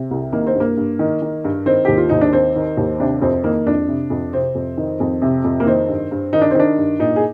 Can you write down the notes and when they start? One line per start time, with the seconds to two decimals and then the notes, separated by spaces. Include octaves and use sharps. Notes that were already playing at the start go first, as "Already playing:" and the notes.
Already playing: C3
0.11 C2
0.33 D#3 A#3
0.47 C4
0.55 G2 A#3
0.77 G2
0.99 D#3
1.22 D#3
1.44 G2
1.66 D#3 C4
1.85 D#2 G4
1.98 F4
2.09 D#2 D#4
2.21 D4
2.33 D#3 C4
2.56 D#3
2.77 D#2
3.00 C3 D4
3.22 F2 C4
3.44 D#3 A#3
3.66 F2 D4
3.88 C3
4.10 F2
4.33 C3 C4
4.55 F2
4.77 D#3
5.00 F2
5.22 C3
5.44 F2
5.60 A#3
5.66 D#3 C4
5.89 G2
6.11 G2
6.33 D#3 D#4
6.41 D4
6.51 C4
6.55 D#3 D4
6.78 G2
7.00 A#2 D#4
7.16 G#4